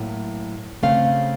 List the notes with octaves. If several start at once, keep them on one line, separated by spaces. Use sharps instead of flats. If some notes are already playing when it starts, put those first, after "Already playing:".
Already playing: A2 F#3 A#3
C#3 A3 C4 F5